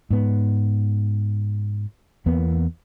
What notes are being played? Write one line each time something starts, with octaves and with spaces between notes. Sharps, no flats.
G#2 B3
E2 A#3 B3